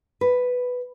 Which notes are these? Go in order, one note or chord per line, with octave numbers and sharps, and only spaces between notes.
B4